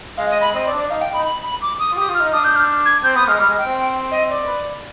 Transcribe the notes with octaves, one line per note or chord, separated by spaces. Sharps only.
G#3 F5
D#5
B5
C4 D#5
D5
D4
D5
D#4 F5
G5
D#4 B5
B5
B5
D6
D#6
F4
G4 D#6
F4
F6
D#4
D4 D#6
G6
F6
G#6
C4 G6
B3 D#6
G#3 F6
G3 F6
G#3
G5
C4
D#5
D5
B4